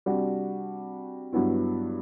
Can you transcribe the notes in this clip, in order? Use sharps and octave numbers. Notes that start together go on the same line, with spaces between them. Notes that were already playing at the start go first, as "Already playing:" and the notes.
C3 G3 D4 F#4
G2 F#3 B3 E4